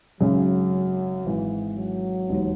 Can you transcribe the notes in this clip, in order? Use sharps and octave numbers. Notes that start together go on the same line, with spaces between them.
G#1 F#2 C#3 F#3
G#1 G#2 E3
F#3
E1 D#2 D#3